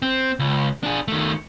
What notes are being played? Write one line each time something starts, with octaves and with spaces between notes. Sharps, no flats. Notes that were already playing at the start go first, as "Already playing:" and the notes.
C4
C#2
D4 G#4
D#3 A3